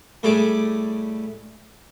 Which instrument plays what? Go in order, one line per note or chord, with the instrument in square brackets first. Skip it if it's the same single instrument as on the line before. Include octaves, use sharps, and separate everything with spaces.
[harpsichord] A2 G3 A3 G#4 D5 D6